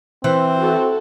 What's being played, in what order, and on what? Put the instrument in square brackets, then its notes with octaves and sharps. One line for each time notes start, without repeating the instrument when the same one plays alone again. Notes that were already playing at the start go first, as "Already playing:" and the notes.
[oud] E3 [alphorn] C4 [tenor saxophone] C5
[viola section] F#4 A4